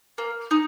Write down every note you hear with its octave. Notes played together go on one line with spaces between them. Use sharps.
A#3
D#4